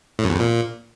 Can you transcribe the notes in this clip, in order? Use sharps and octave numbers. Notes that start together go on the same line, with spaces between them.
A2
F#2
E2
F2
A#2